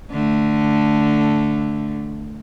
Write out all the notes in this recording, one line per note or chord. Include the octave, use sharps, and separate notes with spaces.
D3 A3